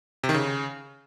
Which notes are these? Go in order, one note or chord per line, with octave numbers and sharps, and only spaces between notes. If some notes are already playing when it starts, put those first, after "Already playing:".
C3
D#3
C#3